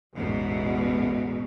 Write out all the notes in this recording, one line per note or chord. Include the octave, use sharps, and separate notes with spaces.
A1 E2 G#2 B2